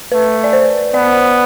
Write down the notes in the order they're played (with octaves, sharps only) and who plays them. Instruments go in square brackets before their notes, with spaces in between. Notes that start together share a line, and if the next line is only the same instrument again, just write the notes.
[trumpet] A3 [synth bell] B4
[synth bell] D5
C5
[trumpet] B3 [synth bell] D5